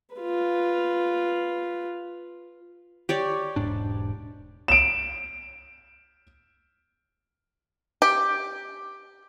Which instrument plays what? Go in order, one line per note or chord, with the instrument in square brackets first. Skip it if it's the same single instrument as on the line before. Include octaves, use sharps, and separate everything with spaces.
[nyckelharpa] F4 B4
[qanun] G4 C#5 D5
[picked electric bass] E1 G#2 D4
[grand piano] D7 E7
[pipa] G4